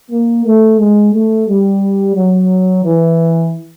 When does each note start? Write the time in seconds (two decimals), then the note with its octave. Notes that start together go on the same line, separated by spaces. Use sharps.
0.11 A#3
0.45 A3
0.80 G#3
1.14 A3
1.48 G3
2.16 F#3
2.84 E3